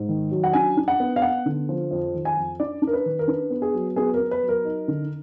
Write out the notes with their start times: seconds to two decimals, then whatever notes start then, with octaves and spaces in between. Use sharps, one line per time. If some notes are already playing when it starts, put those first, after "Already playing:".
Already playing: G#2
0.09 D#3
0.31 F#3
0.44 F#5
0.53 D4 G#5
0.77 D4
0.88 F#5
1.00 B3
1.16 F5
1.22 B3 F#5
1.46 D3
1.69 F3
1.91 F2
2.14 D#3
2.25 G#5
2.37 F2
2.60 D4 D5
2.82 D4
2.87 A#4
2.93 B4
3.06 D#3
3.19 A#4
3.28 D4 B4
3.50 B3
3.62 G#4
3.74 F#3
3.96 B3 G#4
4.14 A#4
4.19 B3
4.31 B4
4.43 F#3
4.49 A#4
4.65 D#4
4.88 D3